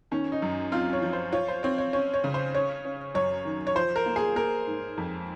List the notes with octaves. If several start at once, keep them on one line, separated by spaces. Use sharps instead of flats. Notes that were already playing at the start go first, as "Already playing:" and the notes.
D#3 C#4
D#4
F#2
C4 F4
C#5
F3
C5
F4 C#5
C5
C4 C#5
C#5
C#4 C#5
C#5
C#3
C5
C#4 C#5
C#4
F#2 C#5
D#3
C#5
F3 C5
A#4
A#3
G#4
A#3 A#4
G#2
F2